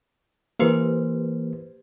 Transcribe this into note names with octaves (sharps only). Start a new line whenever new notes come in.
E3 A#3 G4 B4 C5